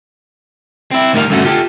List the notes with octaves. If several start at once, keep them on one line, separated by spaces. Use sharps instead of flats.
C4 E4
D2 A2 D#3 G3 A#4 F5
G2 D3 A3 C#4 F#4
F4 G4 A4